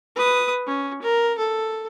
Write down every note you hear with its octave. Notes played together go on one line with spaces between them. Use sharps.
B4 D#6
C#4
A#4
A4